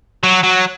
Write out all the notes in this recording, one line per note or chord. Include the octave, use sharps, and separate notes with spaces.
F#3
F#3